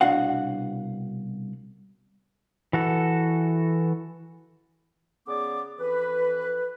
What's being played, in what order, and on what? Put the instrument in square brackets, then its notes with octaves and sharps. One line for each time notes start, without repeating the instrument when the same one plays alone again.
[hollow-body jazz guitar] C2 B2 D4 F#4 F5 F#5
[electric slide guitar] E3 F#4 A4
[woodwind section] C#3 B3 G#4 D5 D6
F2 E3 B4